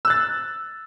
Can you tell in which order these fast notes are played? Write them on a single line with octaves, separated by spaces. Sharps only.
E6 F#6 A6